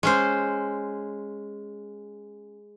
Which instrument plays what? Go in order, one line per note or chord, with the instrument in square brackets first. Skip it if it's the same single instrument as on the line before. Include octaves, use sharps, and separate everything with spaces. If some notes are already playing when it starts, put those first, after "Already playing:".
[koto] G#3 C#4 C5